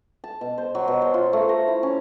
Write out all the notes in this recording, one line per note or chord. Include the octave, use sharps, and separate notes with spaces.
A5
B2
C5
F#3
B2
C5
F4
A3
A#5
E4
C#4